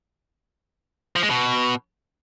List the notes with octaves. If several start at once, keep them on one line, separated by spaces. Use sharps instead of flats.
F3
G#3
B2